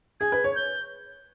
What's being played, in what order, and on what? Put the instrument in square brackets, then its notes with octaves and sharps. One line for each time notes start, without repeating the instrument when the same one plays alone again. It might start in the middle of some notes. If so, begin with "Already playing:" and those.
[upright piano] G#4 [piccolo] G#6
[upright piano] B4
C#5
[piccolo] G6